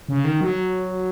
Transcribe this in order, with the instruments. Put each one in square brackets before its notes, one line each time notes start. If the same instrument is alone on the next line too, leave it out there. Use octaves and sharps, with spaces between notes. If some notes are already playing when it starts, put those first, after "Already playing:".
[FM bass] C#3
D#3
F#3